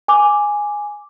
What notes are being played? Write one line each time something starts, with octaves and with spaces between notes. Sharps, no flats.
G#5 D6